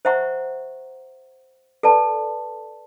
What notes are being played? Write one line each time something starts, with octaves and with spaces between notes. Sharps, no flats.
C5 E5 F#5 A#5 C#6
A4 B4 D5 A5